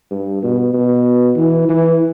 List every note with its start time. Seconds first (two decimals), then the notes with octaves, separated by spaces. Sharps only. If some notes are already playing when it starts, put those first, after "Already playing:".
0.11 G2
0.43 B2
0.74 B2
1.37 E3
1.69 E3